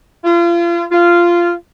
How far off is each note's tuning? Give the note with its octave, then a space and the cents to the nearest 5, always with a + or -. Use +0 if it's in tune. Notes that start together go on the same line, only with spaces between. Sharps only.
F4 -35
F4 -15